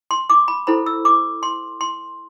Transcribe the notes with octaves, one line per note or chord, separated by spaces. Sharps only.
C6
D6
B5
E4 A4 C5 B5
E6
D6
C6
C6